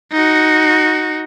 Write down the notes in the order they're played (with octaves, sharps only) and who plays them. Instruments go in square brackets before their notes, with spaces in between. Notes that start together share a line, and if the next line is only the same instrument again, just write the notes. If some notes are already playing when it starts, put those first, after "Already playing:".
[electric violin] D#4 F#4